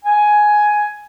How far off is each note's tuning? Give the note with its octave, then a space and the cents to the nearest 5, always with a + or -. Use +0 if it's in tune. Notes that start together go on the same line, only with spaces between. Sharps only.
G#5 +10